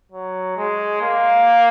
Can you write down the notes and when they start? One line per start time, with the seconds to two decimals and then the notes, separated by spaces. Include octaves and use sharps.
0.12 F#3
0.57 G#3
1.02 A#3